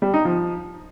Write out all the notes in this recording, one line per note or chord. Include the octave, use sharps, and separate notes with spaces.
G3
D#4
F3